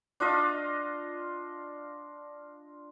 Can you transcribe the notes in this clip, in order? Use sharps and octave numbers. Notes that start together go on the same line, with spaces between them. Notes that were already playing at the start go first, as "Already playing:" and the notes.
D4 F4 D#5 F5